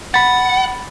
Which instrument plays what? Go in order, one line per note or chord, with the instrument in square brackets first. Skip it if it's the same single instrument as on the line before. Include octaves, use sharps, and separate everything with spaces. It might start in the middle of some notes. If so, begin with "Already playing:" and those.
[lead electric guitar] F#5 [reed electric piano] B5 A6